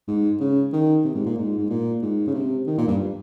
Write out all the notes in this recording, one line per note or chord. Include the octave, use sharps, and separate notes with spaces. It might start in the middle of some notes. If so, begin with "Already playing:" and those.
G#2
C#3
D#3
C3
G#2
A#2
G#2
G#2
A#2
G#2
C#3
C3
D#3
A#2
G2